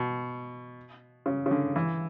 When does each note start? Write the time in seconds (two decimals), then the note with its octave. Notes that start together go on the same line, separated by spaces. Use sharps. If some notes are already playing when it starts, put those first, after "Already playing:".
Already playing: B2
1.26 C#3
1.46 C#3
1.51 D3
1.76 E3